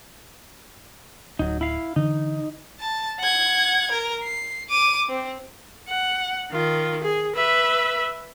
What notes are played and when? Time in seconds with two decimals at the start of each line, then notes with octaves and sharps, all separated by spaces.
1.39 D1 F#3 D#4
1.61 E4 F5
1.96 D3 E3 D#4
2.80 A5
3.20 F#5 G#6
3.91 A#4
4.23 C7
4.70 D6 D#7
5.09 C4
5.88 F#5
6.51 D#3 F4
7.03 G#4
7.36 B4 E5